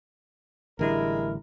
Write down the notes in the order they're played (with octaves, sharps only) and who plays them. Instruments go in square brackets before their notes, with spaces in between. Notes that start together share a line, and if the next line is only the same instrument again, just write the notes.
[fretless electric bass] A1 D3 G3 [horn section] G#3 E4 A#4